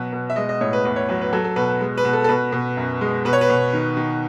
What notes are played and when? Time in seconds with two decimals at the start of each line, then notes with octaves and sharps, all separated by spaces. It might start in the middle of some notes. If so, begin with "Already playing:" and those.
Already playing: B2 F#3 B4
0.13 B2
0.30 E5
0.36 G#3 D#5
0.49 D#5
0.61 A2 C#5
0.73 B4
0.85 E2 B4
0.96 C#5
1.09 F#3 B4
1.21 B4
1.33 F#3 A4
1.44 A4
1.56 B2 B4
1.81 G#3
1.98 B4
2.05 B2
2.13 A4
2.24 A4
2.29 B2 B4
2.52 B2
2.77 F#2
3.01 G#3
3.25 B2 B4
3.33 C#5
3.41 B4
3.50 B2
3.73 D#3
3.97 D#3